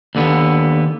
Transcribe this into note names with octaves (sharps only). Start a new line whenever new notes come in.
D#2 D3 B3